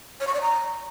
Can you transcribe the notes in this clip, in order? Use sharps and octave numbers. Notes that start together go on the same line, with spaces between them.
C#5
C#6
D5
A#5